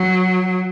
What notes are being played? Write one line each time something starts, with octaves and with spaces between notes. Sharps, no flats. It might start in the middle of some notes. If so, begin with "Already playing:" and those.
Already playing: F#3